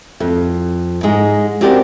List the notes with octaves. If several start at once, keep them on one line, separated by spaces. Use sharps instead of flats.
F2
G#2 G#3 G#4
C4 C#4 F#4 G4 A#4 D5